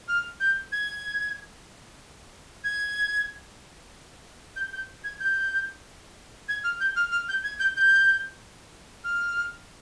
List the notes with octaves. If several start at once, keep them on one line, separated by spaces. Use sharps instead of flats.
F6
G6
G#6
G#6
G6
G6
G#6
G6
G#6
F6
G6
F6
F6
G6
G#6
G6
G6
F6